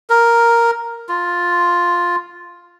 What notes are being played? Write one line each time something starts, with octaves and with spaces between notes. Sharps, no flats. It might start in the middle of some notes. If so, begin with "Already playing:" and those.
A#4
F4